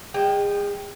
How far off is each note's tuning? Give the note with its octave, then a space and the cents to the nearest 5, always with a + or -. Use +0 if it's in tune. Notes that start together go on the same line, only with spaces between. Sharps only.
G#3 -35 G5 +0